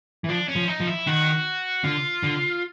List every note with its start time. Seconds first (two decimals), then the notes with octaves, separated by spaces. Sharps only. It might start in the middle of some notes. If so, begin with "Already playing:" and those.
0.24 E3
0.29 F3 D4
0.48 C#4
0.56 F3
0.68 D#4
0.80 F3
0.87 E4
1.07 D#3 F#4
1.84 D3 F4
2.23 D3